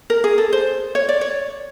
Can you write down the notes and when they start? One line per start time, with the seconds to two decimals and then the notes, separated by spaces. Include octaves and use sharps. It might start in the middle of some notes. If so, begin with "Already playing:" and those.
0.10 A#4
0.24 G#4
0.38 A4
0.53 C5
0.95 C#5
1.09 D5
1.21 C#5